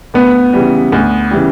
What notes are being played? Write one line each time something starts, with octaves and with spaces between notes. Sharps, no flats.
D2 B3
C#3 E3 G3
D2
C#3 E3 G3